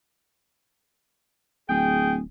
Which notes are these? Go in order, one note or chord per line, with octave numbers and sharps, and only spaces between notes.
D1 G#4 G5